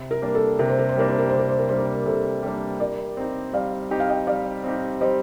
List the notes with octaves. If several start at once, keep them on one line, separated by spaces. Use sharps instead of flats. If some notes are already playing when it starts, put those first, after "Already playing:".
Already playing: C3
A#4
G3 A#3 D4
A4
C3 A#4
C5
A#4
C5
G3 A#3 D4 A#4
C5
A#4
C3 C5
A#4
C5
A#4
G3 A#3 D4 C5
A#4
C3 A4 C5
G3 A#3 D4
G3 A#4 D5
C4 D#4 G4
G3 D5 F5
C4 D#4 G4 G5
F5
D#5 G5
G3 D5 F5
C4 D#4 G4
G3 C5 D#5